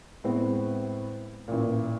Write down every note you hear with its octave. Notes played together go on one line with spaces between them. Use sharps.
A2 G#3 B3 C4
A1 A#2